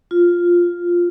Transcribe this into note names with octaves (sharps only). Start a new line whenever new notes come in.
F4